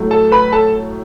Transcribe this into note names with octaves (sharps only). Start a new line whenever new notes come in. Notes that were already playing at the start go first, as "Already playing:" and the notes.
Already playing: A2 F#3 A3
A4 A5
B4 B5
A4 A5